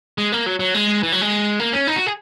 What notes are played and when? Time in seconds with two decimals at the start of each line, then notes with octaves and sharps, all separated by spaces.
0.18 G#3
0.32 A#3
0.46 F#3
0.59 F#3
0.74 G#3
1.03 E3
1.12 F#3
1.21 G#3
1.59 A#3
1.73 C#4
1.87 D#4
1.96 F#4
2.07 G#4